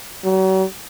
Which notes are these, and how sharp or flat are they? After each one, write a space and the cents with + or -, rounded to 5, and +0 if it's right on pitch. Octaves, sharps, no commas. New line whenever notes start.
F#3 +40